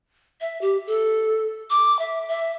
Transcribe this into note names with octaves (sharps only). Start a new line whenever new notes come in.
E5
G4
A4
D6
E5
E5